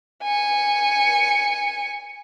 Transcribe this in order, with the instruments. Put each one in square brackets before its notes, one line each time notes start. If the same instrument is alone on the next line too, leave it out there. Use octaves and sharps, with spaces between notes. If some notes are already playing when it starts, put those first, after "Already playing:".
[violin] G#5 C#7